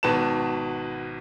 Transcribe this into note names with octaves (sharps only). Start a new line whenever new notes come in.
G#1 B2 B4 A5 E7